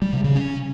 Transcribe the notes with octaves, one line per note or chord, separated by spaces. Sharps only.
G3
C3
C#3
C#4